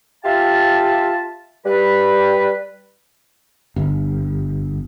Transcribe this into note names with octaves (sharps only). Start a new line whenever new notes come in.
F4 G4 E5 F5 A5
G3 B4
G1